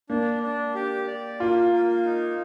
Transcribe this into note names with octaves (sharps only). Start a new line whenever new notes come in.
A#3 D4
D4
G4
D5
A#3 F4
A#3
D#4